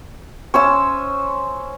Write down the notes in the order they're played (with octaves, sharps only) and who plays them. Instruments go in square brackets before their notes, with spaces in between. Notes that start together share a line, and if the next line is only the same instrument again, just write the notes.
[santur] C#4 C5 E6